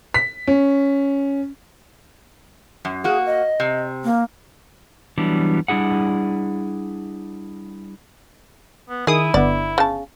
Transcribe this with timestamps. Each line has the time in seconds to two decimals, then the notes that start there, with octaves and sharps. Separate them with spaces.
0.14 B6
0.47 C#4
2.85 F#2
3.04 A#3 F#4 G#4
3.26 D#5
3.60 C3
4.04 A#3
5.18 E3 F#3 G3 B3 D4 E4
5.68 G3 D4 E4 G#4 F#5
8.89 B3
9.07 D#3 E4 G#4 D#6
9.34 G1 D3 B3 D5
9.78 C#3 A5